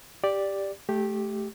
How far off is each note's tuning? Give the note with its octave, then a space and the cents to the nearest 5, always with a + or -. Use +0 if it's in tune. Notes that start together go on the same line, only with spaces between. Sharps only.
G4 +5 D5 +0
A3 -20 G4 +0